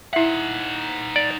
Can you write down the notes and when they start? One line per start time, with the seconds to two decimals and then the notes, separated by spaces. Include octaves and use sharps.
0.13 D#4 E4 E5 F#5
1.16 D5